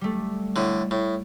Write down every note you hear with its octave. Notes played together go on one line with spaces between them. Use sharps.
G3 A3
A2 D3
A2